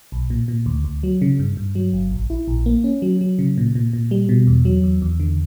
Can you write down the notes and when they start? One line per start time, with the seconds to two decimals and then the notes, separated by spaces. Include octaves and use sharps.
0.12 B1
0.30 A#2
0.48 A#2
0.66 D2
0.84 D2
1.03 F#3
1.22 C#3
1.39 G2
1.57 G2
1.75 F#3
1.93 G1
2.11 A#1
2.30 E4
2.48 A#1
2.66 A#3
2.84 C#4
3.02 F#3
3.21 F#3
3.39 C#3
3.57 A#2
3.75 A#2
3.93 A#2
4.11 G3
4.29 B2
4.47 E2
4.65 F#3
4.83 E2
5.02 E2
5.20 D3